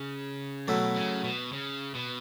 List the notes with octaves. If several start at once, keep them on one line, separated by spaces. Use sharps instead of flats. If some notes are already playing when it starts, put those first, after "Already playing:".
Already playing: C#3
B2 F#3 A3 E4
C#3
B2
C#3
B2